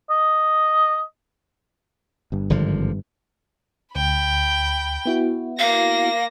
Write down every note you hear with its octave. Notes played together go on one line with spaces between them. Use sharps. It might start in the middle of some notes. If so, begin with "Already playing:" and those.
D#5
G1 G2
G#1 D3 F3
D2 G5 B5
B3 E4 F#4
A#3 F5 A#6